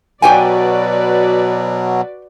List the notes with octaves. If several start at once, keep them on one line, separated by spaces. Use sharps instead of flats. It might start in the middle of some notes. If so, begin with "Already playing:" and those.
B2 F#3 F#4 G4 B4 D5 G5 G#5